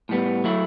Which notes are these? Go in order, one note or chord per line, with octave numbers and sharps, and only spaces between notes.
A2 G3 B3
F#3 A3 E4